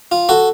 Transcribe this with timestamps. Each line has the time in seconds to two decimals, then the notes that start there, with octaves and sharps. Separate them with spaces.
0.12 F4
0.29 F#4 A4